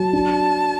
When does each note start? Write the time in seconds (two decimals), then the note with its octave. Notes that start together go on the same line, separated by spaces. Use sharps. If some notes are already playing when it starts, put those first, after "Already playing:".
Already playing: F#3 A5
0.13 D4